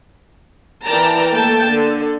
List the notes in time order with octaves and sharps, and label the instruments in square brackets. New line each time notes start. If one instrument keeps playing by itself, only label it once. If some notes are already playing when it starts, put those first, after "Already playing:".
[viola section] E3 A#4 D5 G5 A5 A#5
A3 A#3 A4 G5 A5
D3 A4